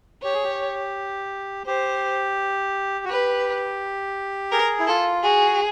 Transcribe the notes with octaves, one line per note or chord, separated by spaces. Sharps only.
G4 C#5
G#4
G4
G4 C5
F#4
G4 B4
G#4 A#4
E4
F4 A4
F#4 G#4